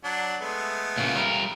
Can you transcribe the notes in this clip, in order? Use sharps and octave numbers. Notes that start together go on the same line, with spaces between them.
F#3 D4
G#3 A3 B3
A#2 C#3 A#3
G3 A#4